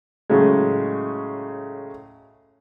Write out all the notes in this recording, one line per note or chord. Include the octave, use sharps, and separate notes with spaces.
A2 C#3 F#3 G#3